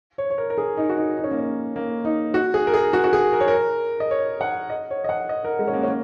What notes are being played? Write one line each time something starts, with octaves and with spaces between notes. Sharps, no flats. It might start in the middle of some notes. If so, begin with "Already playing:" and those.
C#5
C#5
A#4
A#4
G#4
D#4
F#4
D#4
D#4
C#4
A#3
C#4
A#3
D#4
F#4
G#4
A#4
G#4
F#4
F#4
G#4
A#4
C#5
A#4
D#5
C#5
F#5
D#5
C#5
D#5
F#5
D#5
A#4
G#3
C#4
A#3
C#4
A#3